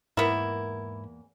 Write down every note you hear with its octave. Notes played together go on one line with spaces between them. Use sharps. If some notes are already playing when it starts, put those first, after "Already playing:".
E2 G#2 A#3 B3 E4 A#4